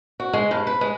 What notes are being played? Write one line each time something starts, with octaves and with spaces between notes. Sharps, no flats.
F#4
G#3
G2
B4
G#3